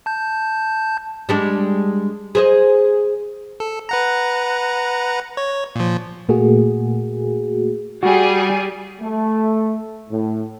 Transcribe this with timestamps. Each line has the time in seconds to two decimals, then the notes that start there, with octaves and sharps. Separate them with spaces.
0.06 A5 G6
1.29 G3 G#3 D4
2.35 G#4 C5 D#5
3.60 A4
3.89 B4 F#5 A#5
5.37 C#5
5.76 A#2 F3
6.29 A#2 A3 A#3 F#4 G#4
8.03 G3 F#4 G#4
9.01 A3
10.10 A2